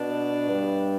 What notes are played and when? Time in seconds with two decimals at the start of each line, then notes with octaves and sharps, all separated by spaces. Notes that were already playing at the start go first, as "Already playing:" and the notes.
Already playing: B2 D4
0.49 G2